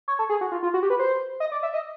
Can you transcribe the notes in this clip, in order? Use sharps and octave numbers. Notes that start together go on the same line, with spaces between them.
C#5
A4
G#4
F#4
F4
F4
F#4
G4
B4
C5
D#5
D5
E5
D#5